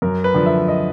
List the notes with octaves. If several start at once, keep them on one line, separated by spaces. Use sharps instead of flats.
F#2 A#4
B4
D3 F3
E5
D#5